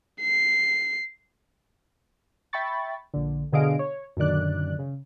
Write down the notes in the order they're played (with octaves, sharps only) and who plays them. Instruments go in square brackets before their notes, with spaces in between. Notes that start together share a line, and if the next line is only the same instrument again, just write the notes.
[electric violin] C7
[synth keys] E5 G5 B5 C#6 A6
A#1 D3
B2 D3 G#4 D#5 F5 D7
C#5
F#2 A#2 D3 D#3 D5 F#6
C#3